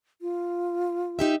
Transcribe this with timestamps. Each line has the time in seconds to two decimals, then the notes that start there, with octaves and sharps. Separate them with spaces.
0.22 F4
1.19 D#4 G4 E5